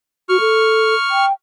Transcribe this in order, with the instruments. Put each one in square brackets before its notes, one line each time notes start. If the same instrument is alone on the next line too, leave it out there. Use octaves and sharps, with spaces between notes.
[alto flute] F#4 [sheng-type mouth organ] C#6 F6
[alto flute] A4
G5